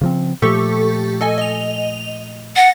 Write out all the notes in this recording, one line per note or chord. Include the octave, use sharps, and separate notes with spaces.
C#3 F3 C4
A#2 F3 A3 G4 A4 C#6
A4 D#5 G#5
D#5 F7
F#5 A6 A#6